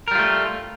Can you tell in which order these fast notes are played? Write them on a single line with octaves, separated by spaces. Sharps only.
A#4 G3 F4 A3